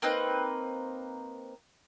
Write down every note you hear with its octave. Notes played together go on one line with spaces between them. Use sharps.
A#3 C4 D#4 B4